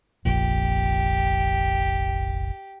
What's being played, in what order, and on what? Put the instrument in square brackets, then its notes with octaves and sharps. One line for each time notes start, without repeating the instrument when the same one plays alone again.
[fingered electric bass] F1 A#1 F2 [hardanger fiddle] G4